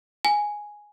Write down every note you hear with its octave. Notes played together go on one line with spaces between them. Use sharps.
G#5